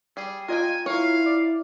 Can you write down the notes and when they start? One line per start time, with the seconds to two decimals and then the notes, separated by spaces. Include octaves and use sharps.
0.17 G3 G#4
0.48 F4 A#4 D#5 G5 G#5
0.86 E4 A#4 C#5 F5
1.26 D5